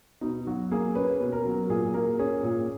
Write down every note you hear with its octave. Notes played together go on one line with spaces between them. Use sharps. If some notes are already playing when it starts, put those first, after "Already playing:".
B2 D#4
F#3 F#4
A#3 G#4
C#4 B4
B2
A#4
F#3
A#2 G#4
A#3 A#4
C#4 G#4
A#2